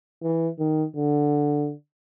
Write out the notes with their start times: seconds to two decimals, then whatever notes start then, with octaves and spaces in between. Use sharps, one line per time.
0.23 E3
0.59 D#3
0.96 D3